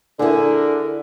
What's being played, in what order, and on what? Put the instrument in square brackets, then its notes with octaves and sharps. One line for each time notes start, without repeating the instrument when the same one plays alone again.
[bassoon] D3 [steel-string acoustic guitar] E4 G#4 [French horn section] A#4